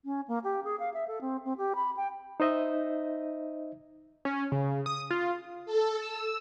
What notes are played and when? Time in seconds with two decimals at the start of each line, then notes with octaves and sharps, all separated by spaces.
0.05 C#4
0.28 A#3
0.44 G4
0.64 G#4
0.80 F5
0.94 E5
1.08 A4
1.21 C4
1.45 C4
1.58 G4
1.76 B5
1.97 G5
2.40 D#4 C5 D#5 E5
4.25 C#4
4.52 C#3
4.86 D#6
5.11 F4
5.66 A4
5.97 E6